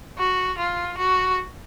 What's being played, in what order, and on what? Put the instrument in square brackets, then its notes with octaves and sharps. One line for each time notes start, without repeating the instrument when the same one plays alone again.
[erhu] F#4
F4
F#4